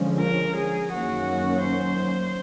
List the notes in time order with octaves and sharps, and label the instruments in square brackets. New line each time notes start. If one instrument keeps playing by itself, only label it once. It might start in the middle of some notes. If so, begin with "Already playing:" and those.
Already playing: [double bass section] D3 F3 G#3 C#4
[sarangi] A#4
G#4
[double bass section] F#2 D#3 F#3 A#3 C#4 [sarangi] F#4
[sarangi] C5